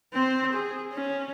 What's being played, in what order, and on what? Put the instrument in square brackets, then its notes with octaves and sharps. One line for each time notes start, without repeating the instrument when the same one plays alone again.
[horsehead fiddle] C4 C5
G#4
C#4